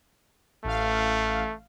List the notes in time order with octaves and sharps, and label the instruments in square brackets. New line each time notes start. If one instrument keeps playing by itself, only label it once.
[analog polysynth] A1 F5 [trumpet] A3